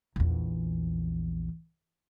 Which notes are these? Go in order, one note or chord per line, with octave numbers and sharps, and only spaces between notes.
A#1 E2